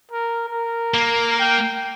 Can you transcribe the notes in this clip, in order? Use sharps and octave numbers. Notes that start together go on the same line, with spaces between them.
A#4
A#4
A#3
G5